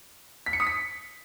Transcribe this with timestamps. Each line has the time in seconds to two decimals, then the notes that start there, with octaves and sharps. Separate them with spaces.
0.46 B6
0.53 C#7
0.60 D#6
0.67 B6